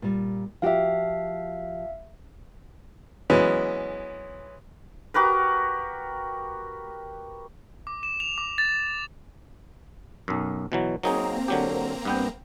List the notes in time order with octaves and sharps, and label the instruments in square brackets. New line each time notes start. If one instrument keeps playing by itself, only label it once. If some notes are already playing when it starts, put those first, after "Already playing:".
[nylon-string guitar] A#2 G3
[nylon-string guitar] F3 F#4 G4 [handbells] E5 F5
[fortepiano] E3 F#3 G#3 B3 C#4
[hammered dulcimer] F#4 G4 A#4 B4
[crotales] D6
E7
F7
D6
A6
[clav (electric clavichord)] B1 F#2
B2 E3 F#3
[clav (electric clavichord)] F#3 D#4 G#4 [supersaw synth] A#3 C4 A#5
[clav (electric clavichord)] D3 F#3 G4
G2 B3 G5